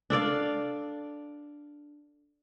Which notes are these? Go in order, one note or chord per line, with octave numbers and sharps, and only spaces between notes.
D4 A4 D5 F5